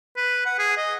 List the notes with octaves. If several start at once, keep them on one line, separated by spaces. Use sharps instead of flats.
B4
F#5
G#4
D#5